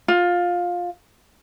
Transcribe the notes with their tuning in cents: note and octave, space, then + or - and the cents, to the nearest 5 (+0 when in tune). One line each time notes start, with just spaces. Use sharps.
F4 +15